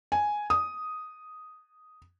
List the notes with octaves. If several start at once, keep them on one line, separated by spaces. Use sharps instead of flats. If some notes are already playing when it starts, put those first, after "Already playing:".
G#5
D#6